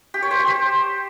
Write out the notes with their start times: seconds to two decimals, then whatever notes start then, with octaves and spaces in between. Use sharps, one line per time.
0.14 G4
0.22 C#5
0.31 C5
0.39 G4
0.47 C5